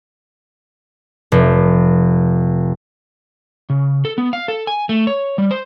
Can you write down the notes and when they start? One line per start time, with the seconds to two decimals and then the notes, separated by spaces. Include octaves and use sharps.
1.32 F1
3.70 C#3
4.05 A4
4.18 B3
4.33 F5
4.48 A4
4.67 G#5
4.89 A3
5.07 C#5
5.38 G3
5.51 C5